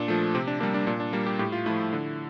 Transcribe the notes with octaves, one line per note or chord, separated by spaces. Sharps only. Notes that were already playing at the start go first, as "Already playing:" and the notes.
Already playing: A#2 D4
F3 A3
C3 C4
D4
G3 A#3 D4
D4
A#2 D4
D4
G3 A#3
G4
A2 G4
F4
F3 A3 E4
E4
D3